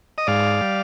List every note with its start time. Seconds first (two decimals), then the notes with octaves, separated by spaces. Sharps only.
0.18 D#5
0.27 G#2 D5 F5
0.61 G3